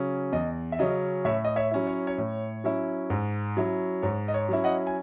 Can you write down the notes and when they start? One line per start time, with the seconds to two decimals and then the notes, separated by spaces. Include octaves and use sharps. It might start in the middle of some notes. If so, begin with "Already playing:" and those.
Already playing: C#3 F#3 C#4
0.32 E2 D#5
0.72 E5
0.79 C#3 F#3 C#4 D#5
1.25 A2 C#5 E5
1.45 D#5
1.56 C#5 E5
1.71 F#3 C#4 E4
1.87 C#5
2.07 C#5
2.18 A2
2.64 F#3 C#4 E4
3.10 G#2
3.57 F#3 C#4 E4
4.02 G#2 C#5
4.28 D#5
4.34 C#5
4.49 F#3 C#4 E4
4.64 D#5 F#5
4.87 G#5